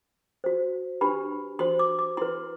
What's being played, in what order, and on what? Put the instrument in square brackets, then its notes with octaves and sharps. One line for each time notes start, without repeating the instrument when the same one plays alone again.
[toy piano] F#4 C5
D4 G4 B4 B5
F#4 C5 C6
D6
D6
E4 B4 C6